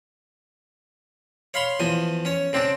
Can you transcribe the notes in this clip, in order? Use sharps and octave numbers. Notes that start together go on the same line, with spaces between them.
C#5 F5 B5 C6
E2 F3 G#5
C#4 C#5
C#3 C4 D4